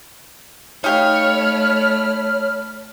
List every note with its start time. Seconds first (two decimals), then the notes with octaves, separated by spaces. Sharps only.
0.84 A3 D#4 G4 C#5 F5 B5 F6